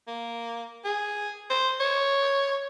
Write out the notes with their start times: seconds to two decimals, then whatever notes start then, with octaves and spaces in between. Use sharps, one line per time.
0.08 A#3
0.85 G#4
1.50 C5
1.80 C#5